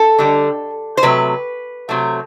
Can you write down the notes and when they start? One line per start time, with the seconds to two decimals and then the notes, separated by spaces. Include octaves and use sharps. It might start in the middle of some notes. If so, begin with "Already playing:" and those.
Already playing: A4
0.19 D3 G3
0.97 C5
1.03 C3 F#3 A3 B4
1.89 C3 F#3 A3